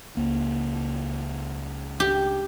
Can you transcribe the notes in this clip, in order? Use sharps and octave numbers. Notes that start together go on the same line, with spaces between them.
C#2 A#3
G4